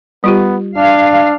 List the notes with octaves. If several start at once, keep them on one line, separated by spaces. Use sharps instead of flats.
G3 B3 F4 G4
D4 F5